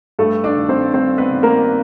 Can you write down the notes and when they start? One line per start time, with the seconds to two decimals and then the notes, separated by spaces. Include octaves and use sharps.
0.19 G2 A3 A4
0.44 D4 D5
0.56 D#3
0.69 C4 C5
0.94 G2 C4 C5
1.18 B3 B4
1.31 D#3
1.43 A#3 A#4